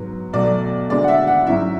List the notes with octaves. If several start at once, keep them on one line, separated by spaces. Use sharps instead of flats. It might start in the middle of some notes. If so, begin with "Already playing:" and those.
Already playing: G#2 F#3 B3
B1 B2 F#3 A3 D5
D2 D3 G#3 D5
F#5
E5
F#5
G#2 F#3 C#4 E4 E5